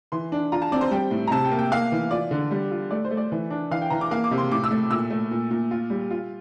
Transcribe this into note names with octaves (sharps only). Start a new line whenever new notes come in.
E3 C6
D4
F4 A#5
A5
C4 D5
C5
G3 G5
A2
A#5
C3 A5
G5
A#3
G5
A#3 F5
E3
F4 D5
D3
G3
F4
A3 D5
C5
A3
D5
E3
D4
E3 F5
G5
E3 A#5
D6
A#3 F5
D6
C3
C6
A2 D6
E6
A3
A#2 E6
A3
A#2
A#2
F4
G3
F4